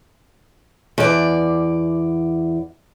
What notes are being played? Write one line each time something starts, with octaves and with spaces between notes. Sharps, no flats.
E2 D5